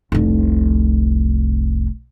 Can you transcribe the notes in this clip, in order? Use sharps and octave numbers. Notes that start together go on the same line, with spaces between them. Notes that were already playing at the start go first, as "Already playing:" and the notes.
F1 C2